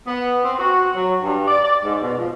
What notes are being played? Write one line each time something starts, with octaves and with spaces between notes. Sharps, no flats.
B3
C4
F#4
F#3
G2
D5
D5
G#2
B2
F3